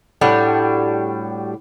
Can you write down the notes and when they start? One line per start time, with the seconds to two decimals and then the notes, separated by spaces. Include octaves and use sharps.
0.21 A2 G3 D4 F#4